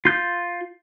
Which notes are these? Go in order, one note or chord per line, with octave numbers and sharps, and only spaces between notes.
F4 G6